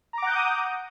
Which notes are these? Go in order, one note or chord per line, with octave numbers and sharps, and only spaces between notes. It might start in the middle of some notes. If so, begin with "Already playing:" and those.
F#5 A#5 D6 D#6 G6